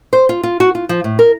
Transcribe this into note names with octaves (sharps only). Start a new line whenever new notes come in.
C5
F4
F4
F#4
F4
F3
A2
A#4